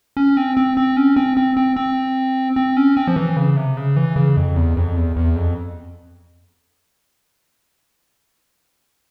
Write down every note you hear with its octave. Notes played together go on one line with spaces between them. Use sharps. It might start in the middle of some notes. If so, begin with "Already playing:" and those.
C#4
C4
C4
C4
C#4
C4
C4
C4
C4
C4
C#4
C4
F3
E3
C#3
C3
C#3
E3
C#3
F2
E2
F2
E2
E2
F2